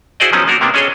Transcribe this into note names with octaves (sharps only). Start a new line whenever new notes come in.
E4 F#4 G#4 C5 D5 D#5
F3 F#3 B3 C#4 D#4
A#3 D4 F#4 A#4
C3 A#3 B3 D4
C#4 D4 G#4 A4 C#5 D#5